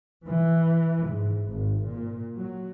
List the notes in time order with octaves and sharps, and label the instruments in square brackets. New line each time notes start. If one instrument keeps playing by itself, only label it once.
[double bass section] E3
G#2
G#1
A#2
F#3